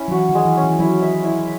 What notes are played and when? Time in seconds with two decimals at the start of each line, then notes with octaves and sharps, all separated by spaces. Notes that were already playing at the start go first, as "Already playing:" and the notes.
Already playing: C#4 E4
0.08 F#3
0.11 E3 F#4
0.29 D#3
0.35 G#3
0.45 E3
0.57 C#4
0.63 E3
0.79 F#3 E4
1.02 E5
1.24 E4